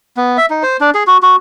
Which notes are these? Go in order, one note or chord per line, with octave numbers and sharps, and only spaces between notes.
B3
E5
D#4
C5
D4
G#4
F#4
F#4